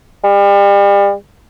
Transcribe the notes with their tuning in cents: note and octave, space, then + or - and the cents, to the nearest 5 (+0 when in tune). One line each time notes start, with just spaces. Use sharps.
G3 +35